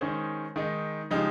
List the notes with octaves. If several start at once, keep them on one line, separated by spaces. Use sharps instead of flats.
D#3 G#3 C#4 G#4 C5
D#3 G#3 D#4
C#3 F3 G#3 D#4 G4